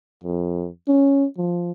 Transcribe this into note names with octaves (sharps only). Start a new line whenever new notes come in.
F2
C#4
F3